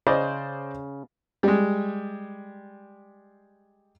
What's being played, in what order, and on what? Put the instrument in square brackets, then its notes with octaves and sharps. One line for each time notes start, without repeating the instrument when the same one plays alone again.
[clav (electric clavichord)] C#3 [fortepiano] C5 D5 D#5
[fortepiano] G3 G#3